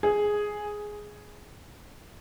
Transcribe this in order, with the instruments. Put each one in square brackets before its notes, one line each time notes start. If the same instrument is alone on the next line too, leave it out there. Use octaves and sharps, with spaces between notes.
[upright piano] G#4